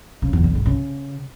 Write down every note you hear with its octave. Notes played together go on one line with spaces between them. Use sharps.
C#3
E2
D3
G#2
C#3